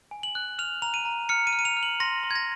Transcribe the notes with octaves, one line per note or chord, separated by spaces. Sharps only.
G#5
F#7
F#6
F6 F7
A#5 F7
D#7
A#5
F6 C#7
D#7
F6
D#7
F7
F6
F#7
C6 A#6
C6
G#6
A#6